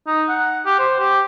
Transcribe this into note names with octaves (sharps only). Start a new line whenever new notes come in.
D#4
F#5
G4
C5
G4